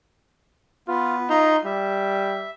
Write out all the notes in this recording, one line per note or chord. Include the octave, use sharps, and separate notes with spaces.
B3 F4 B4
D#4 F4 A#5 C6
G3 E5